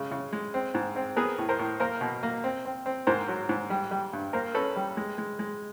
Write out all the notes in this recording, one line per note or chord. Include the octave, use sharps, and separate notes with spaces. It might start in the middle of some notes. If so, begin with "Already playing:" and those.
Already playing: C#3 G#3
C#3
G#3
C4
G#2
C4
B3 G#4 A#4
A2
A#4 C5
A2
A#3 A#4 C5
B2
A#3
C4
C4
C4
G#2 A#4 C5
F#3
G#2
G3
G3
G2
A#3 A#4 C5
C#4 A4 B4
G3
G#3
G#3
G#3